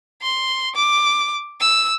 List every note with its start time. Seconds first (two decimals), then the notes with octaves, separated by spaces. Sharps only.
0.22 C6
0.75 D6
1.60 E6